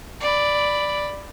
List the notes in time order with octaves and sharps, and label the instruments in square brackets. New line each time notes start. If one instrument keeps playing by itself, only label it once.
[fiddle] D5 B5